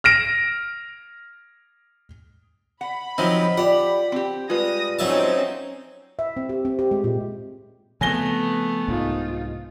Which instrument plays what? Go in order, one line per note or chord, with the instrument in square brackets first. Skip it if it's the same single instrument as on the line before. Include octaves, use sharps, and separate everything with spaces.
[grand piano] F6 A#6 D7
[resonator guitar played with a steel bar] F#5 [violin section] B5
[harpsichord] F3 F#3 C4 [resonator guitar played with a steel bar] D#4 [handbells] D#5 E5
[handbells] F4 [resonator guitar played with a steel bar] G4 D5 [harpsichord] F#5
[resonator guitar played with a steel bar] C4 G4
[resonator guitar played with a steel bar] G3 G#3 [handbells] F4 B4 [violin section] D#6 A#6
[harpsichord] F#3 E5 A5 [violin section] C4 C#4 D#4
[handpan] E5
C4
G4
C4
G4
G#3
A#2
[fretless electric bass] C#3 F3 C4 [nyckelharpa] A3 B3 [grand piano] G#5 A#6 G7
[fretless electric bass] C2 G#2 [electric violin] D#4 F4